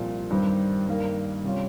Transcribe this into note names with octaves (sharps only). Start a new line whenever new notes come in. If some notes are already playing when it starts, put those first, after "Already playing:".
Already playing: C2 A#2 F3 A#3
G2 D#3 G3 C4
G2 D#3 A#3
C3 G3 C#4 F4